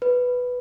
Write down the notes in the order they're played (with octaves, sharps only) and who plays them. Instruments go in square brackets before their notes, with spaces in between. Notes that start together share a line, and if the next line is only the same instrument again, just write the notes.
[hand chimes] B4